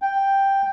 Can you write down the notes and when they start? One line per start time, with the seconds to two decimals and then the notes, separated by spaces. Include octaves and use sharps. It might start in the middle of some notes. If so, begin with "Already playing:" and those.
0.02 G5